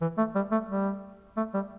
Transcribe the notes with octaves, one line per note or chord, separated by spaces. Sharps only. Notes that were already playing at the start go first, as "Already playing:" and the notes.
E3
A3
G3
A3
G3
A3
G3